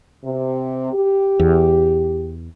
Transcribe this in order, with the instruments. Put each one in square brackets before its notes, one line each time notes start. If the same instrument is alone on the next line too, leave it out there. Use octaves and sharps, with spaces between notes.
[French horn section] C3
G4
[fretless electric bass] E2